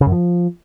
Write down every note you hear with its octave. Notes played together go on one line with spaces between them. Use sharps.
C#3
F#2
F3